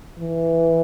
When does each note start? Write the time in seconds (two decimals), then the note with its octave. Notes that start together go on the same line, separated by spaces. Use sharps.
0.19 E3